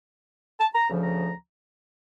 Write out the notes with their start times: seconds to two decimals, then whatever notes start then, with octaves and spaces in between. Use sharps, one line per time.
0.60 A5
0.75 A#5
0.89 D2 C#3 F3
1.02 A#5